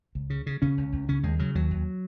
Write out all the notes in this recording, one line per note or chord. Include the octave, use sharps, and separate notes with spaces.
C#2
C#3
C#3
C#3 C#4
C#2
C#2
C#3 C#4
D#2 G#3
C#3 F#3
D#2 F#3
D#2